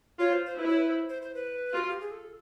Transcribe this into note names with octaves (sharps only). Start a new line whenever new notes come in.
F4 C#5
C5
C5
E4 B4
C#5
B4
C5
C5
C5
B4
F4 F#4
G4
G#4
A4